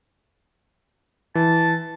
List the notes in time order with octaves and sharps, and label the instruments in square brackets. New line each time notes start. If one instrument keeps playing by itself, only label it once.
[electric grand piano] E3 [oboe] A5